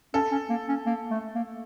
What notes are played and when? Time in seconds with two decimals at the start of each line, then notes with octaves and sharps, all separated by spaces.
0.14 C#4 A4
0.31 C#4
0.50 A#3
0.69 C#4
0.86 A#3
1.11 A3
1.35 A#3